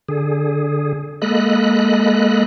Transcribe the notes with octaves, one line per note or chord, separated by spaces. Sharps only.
D3 G#4
G#3 A#3 A4 D#5 B5 F#6